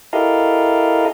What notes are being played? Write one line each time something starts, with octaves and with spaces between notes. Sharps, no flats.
E4 G4 A4 A#4 D#5 F5